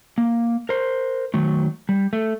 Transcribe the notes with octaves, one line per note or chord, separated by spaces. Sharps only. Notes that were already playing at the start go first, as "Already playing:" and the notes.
A#3
A#4 C5
D#3 F#3 A3
G3
A3